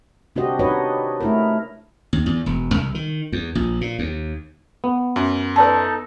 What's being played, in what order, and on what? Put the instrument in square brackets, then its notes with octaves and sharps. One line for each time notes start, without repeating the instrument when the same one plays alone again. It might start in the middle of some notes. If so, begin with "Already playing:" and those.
[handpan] C3 D4 F#4 G4 C5 D#5
D4 D#4 F#4 B4 C#5 D#5
A3 E4 A#4
[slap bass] D#2
E2
E1
C2
D#3
E2
A#1
A#2
D#2
[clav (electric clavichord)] B3
[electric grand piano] F#2
[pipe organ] D#4 A4 [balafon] B4 D5 A5